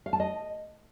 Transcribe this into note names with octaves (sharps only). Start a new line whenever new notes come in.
F5
A5
D#5